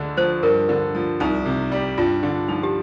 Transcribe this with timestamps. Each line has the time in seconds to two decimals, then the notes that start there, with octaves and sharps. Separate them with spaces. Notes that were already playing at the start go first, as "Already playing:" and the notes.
Already playing: D2 D3 G#3
0.17 F3 C5
0.43 G2 A#4
0.69 D3
0.95 F3
1.20 C2 D#4
1.45 C3
1.72 G3
1.98 G2 F4
2.23 D3
2.48 F3 D#4
2.63 G4